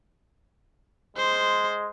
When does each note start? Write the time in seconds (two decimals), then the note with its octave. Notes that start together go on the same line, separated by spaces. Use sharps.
1.17 G#3 C5